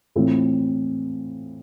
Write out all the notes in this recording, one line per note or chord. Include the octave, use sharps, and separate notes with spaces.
A2 E3 A3 C4 F4